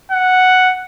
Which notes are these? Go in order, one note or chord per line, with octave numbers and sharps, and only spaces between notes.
F#5